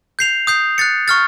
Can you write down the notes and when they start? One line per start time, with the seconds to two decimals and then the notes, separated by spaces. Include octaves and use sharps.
0.19 G6 C7 F7
0.47 D#6 G6 C7
0.78 F#6 A6 C#7
1.08 C#6 F6 A6